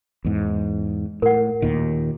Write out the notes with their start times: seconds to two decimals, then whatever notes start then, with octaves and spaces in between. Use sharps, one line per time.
0.25 E2 G#2
1.22 A2 A#4 F#5
1.62 D#2 A#2 D#3